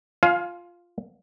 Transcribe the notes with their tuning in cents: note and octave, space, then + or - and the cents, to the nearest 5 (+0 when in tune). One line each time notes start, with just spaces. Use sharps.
F4 +0 F5 +20 G#5 +40